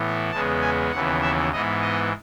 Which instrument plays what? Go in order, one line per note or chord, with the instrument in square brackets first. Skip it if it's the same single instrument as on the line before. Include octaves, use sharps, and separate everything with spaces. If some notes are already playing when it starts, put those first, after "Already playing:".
Already playing: [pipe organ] A2 E3 B3
E2 C#3 G#3 B3 A5
G#5
D#2 C#3 E3 B3 F#5
E5
G#2 E3 B3 D#5
D#5